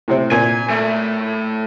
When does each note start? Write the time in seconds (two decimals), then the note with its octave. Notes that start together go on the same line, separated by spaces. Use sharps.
0.08 A2 C3 C4
0.32 A#2 G#5
0.70 A2 A3